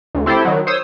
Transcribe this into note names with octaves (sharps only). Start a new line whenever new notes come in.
D2
C4 E4 G4 A4 C5
D#3 F#3
C5 C#5 D#6 E6